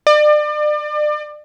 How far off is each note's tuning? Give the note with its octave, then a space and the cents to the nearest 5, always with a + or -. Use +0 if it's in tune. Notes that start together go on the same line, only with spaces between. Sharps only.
D5 +35